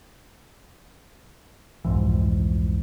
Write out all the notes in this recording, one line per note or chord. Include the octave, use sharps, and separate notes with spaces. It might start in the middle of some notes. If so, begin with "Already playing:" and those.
C2 F2 G#2 E3